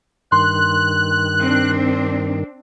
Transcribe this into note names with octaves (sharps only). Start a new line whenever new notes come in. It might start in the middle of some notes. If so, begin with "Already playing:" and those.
G2 D#3 C6 F#6
C4 D4